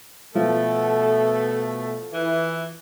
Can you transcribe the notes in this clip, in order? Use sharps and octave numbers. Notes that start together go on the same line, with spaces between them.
B2 F3 A3 A4
E3